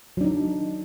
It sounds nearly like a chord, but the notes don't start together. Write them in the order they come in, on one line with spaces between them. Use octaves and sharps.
F#3 D4 D#4